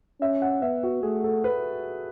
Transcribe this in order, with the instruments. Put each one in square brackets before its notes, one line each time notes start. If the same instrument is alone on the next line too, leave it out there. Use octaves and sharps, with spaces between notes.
[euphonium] C#4 [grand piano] E5
[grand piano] F#5
[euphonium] B3 [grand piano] E5
[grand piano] F#4
[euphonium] A3 [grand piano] G#4
[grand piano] A4
B4